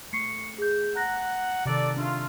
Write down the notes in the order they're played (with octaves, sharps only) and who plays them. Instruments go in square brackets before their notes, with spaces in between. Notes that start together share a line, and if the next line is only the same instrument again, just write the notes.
[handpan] A3 [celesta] C#6 C7 C#7
[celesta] G#4 G6
[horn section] F#5 [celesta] A#5 F#6 A#6
[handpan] C3 D#3 [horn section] A4 D5
[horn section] A3 F4 [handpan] D4